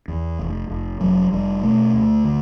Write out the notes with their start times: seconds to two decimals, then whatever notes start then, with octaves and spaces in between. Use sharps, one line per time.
0.08 E2
0.39 F1
0.69 F1
1.01 F1 F#3
1.32 F1 G3
1.63 B2 A3
1.93 D2
2.24 D3